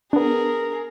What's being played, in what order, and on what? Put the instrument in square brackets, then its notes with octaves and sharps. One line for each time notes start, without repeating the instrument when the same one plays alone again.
[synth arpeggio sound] B3 D4 [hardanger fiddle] G#4 A#4